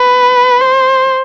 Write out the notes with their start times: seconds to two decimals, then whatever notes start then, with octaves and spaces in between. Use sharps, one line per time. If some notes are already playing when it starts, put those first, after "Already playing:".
Already playing: B4
0.61 C5